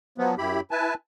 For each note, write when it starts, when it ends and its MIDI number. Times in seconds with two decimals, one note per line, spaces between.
0.18 0.35 53
0.18 0.35 54
0.18 0.35 59
0.38 0.60 42
0.38 0.60 64
0.38 0.60 67
0.38 0.60 83
0.71 0.94 64
0.71 0.94 71
0.71 0.94 80
0.71 0.94 81